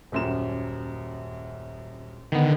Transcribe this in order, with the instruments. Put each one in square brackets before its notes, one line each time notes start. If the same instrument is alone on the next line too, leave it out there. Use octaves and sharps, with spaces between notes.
[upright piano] D#1 F#2 E7
[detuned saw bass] D3 [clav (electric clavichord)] D#3 B3